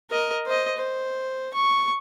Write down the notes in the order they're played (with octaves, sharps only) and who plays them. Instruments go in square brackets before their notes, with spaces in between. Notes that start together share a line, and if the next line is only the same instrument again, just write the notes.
[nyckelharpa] A#4 D#5
C5 D#5
C5
C#6